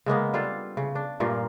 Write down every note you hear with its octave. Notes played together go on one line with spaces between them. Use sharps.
C#3 G#3 A#3 B3
G3 D4 F4 A4
C#3
D4
G2 A#2 A#3 F4